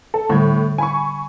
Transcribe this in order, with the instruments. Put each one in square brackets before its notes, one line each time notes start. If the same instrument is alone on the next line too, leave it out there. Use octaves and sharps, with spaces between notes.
[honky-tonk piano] A4
[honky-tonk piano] A2 [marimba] D3 G3
[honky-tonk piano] G#5 B5 C#6